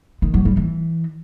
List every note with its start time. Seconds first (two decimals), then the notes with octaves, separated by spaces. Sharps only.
0.22 D#3
0.34 F#3
0.45 G3
0.57 E3